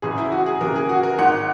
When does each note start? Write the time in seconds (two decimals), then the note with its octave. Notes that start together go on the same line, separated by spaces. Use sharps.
0.02 F#1 F#2 C#3 E3 G#4
0.18 E4
0.32 F#4
0.46 G#4
0.61 D#2 C#3 E3 A#4
0.76 G#4
0.89 F#4
1.03 A#4
1.18 G#1 G#2 D#3 F#5